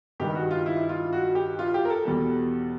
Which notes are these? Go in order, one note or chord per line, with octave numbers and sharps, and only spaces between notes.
G2 D#3 G3 G4
F#4
F4
E4
F4
F#4
G4
F4
G4
A#4
A4
E2 B2 G3